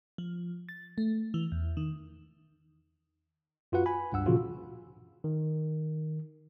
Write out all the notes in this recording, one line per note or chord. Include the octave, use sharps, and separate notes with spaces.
F3
A6
A3
E3
E2
D#3
F#2 F4 F#4 B4 F#5
G#5 B5
C#2 G2 F#5 E6
A#2 C#3 E3 F3 F4 F#4
D#3